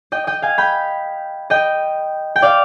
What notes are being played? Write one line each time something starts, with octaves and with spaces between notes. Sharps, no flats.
D#5 G5
D#5 G5
F5 G#5
G5 B5
D#5 G5
G5
D5 F5